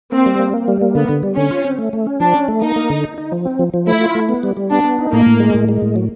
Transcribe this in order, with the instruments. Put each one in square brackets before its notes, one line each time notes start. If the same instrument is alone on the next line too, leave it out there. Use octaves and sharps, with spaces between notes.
[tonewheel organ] A#3 [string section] C4
[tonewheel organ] G3
A#3
A#3
G3
A#3
[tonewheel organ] D3 [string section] B3
[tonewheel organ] D3
G3
[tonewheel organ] D3 [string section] C#4
[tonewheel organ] F4
C4
A3
A3
C#4
[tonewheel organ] F3 [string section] D4
[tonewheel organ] C#4
A3
[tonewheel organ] A#3 [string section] D#4
[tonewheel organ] A#3
D3
D#4
D#4
F3
C4
F3
F3
[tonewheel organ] A3 [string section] E4
[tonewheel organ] F4
A3
B3
G3
G3
[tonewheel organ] B3 [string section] D4
[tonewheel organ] B3
D#4
[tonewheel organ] A2 [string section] A#3
[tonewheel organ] A2
G#3
A2
G#3
A2
F#3